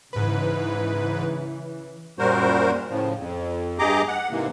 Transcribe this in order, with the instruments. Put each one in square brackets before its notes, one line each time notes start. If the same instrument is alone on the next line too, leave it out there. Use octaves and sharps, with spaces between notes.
[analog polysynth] G#2 B4 [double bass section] C#3 E3
[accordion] F#2 A#2 G3 F#4 A#4 C5
A2 C#3 F3
F2
G2 G4 G#4 D#5 A#5 D6
F#5
G#2 C3 E3 A#3